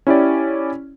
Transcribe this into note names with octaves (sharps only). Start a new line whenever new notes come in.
C#4 E4 G4 D5